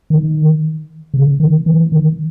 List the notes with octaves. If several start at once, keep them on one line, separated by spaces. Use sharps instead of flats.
D#3
C#3
D#3
E3
D#3